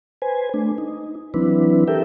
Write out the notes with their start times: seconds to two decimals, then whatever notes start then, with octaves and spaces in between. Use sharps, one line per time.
0.22 B4 C5 G#5
0.54 A3 D4
0.78 D#4
1.34 E3 F#3 C4 D4 E4 B4
1.88 G4 A4 A#4 E5 G5